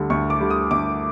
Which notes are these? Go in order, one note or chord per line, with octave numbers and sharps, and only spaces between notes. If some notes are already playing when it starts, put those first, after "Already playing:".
Already playing: D2 D3 G3
D2 C#6
D6
D3 G3
D#6
D2 D6